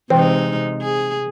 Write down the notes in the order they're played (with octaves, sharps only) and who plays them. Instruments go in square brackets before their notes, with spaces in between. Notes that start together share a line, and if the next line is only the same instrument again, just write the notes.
[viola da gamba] C3 G#3 D#4 [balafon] E3 [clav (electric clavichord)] C4
[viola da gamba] G#4